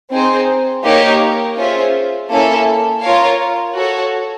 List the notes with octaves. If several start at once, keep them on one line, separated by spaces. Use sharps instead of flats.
C4 D#4 G#4 C5
A#3 D#4 G4 A#4 C#5
C#4 F4 G#4 C5 E5
A#3 C#4 E4 A4
F4 A#4 C#5 F5
F#4 A4 C#5